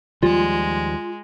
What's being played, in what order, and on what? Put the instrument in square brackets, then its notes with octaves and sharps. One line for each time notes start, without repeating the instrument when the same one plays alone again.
[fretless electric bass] D#2 F3 G3 [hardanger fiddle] G#3 [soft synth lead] F4